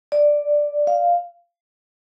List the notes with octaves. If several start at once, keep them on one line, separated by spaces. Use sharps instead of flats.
D5
F5